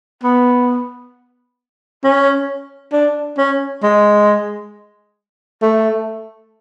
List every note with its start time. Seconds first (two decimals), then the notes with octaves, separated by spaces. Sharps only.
0.23 B3
2.04 C#4
2.92 D4
3.38 C#4
3.83 G#3
5.62 A3